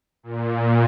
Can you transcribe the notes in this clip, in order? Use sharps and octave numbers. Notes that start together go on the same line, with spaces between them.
A#2